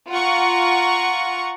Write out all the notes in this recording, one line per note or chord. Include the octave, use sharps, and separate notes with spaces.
F4 F#5 A#5 C#6